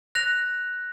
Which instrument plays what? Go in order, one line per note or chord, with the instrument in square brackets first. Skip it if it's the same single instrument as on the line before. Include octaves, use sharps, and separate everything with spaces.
[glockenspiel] F#6 A#6 F7